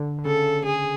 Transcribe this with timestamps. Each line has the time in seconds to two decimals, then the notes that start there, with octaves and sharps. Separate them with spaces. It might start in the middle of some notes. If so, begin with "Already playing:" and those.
Already playing: D3
0.18 D3
0.25 C#3 A4
0.66 G#4